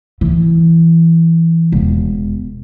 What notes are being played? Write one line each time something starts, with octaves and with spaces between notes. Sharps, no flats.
E3
E1